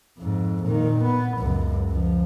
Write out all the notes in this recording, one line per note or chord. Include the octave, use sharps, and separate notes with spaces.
F2 G#2
A#2 D#3
B3
C#2 F#2
C#2 F3